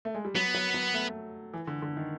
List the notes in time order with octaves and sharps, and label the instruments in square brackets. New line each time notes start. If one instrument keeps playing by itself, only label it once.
[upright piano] A3
G#3
G3
[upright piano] F#3 [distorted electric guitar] B3
[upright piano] F#3
F#3
A3
E3
D3
D3
D#3